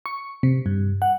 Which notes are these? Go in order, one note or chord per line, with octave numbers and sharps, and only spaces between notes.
C#6
C3
G2
F#5